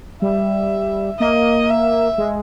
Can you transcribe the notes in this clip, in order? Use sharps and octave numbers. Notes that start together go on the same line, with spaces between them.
G3 E5
A#3 D#5
E5
G#3